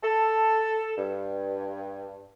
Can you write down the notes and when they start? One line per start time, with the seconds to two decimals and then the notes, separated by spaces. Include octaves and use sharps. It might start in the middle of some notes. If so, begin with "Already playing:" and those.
0.03 A4
0.97 G2